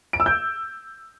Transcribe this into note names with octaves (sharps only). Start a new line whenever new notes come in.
D7
E6
G6